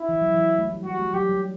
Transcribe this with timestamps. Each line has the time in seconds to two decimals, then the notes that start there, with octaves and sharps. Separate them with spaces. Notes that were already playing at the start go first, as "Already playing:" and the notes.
Already playing: E4
0.09 E3
0.22 F#3
0.34 E3
0.58 A3
0.68 G3
0.84 G3 F#4
0.99 A3
1.14 F#3 G4
1.30 G3